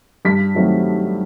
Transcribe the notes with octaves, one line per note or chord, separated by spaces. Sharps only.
G2 B6
D#3 F#3 A3 C4